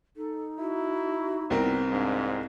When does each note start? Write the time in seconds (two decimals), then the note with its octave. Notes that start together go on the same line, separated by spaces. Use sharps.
0.17 D#4 A4
0.59 E4 F#4
1.50 C2 B3 C4 A#4
1.91 G#2 D4 F5